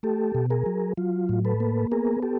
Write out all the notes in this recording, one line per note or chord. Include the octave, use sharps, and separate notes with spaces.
A3 G4 A4
B2
G#4 A#4
F#3
F#3 F4
A2
A4 B4
A#3
B3 G#4 A#4
G4 A4